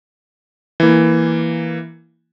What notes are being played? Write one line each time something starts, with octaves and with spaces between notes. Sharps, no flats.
E3 A#3